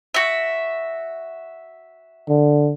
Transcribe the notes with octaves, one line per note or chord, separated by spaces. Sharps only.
F#4 E5
D3